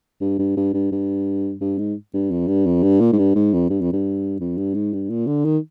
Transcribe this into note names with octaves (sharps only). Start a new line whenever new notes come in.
G2
G2
G2
G2
G2
G2
G#2
G2
F2
G2
F2
G2
A#2
G#2
G2
G#2
F2
G2
F2
G2
F2
G2
G#2
G2
A#2
D3
D#3